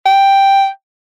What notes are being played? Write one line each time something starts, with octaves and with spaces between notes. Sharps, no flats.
G5